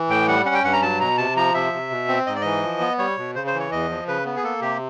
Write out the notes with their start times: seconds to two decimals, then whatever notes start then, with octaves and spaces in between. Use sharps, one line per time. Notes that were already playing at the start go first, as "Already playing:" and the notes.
Already playing: E3
0.09 A2 G5
0.28 G3 F#5
0.46 C#4 F#5
0.54 G5
0.64 G2 F#5
0.73 A#5
0.82 F#3 A5
1.00 B2 A#5
1.18 C3 A5
1.36 F3 A#5
1.54 C3 E5
1.73 C3
1.90 B2
2.08 C4
2.26 G#2 D#5
2.35 D5
2.41 E3 D#5
2.63 F3
2.80 B3
2.99 G3 C#5
3.17 B2
3.35 C#3 C5
3.47 C5
3.54 E3
3.59 C#5
3.72 E2 D#5
3.90 F3
4.07 C#3 B4
4.25 B3
4.36 G#4
4.43 A#3 A4
4.61 C3 G4